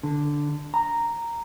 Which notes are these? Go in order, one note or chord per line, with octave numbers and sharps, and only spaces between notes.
D3
A#5